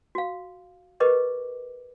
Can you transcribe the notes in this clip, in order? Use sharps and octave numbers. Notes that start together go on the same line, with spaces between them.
F#4 F5
G4 A#4 B4 D#5 D6